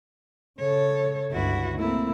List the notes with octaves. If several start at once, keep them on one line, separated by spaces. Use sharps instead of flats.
C#3 A4 C#5
G1 C#2 E4 F#4
A3 A#3 C4 E4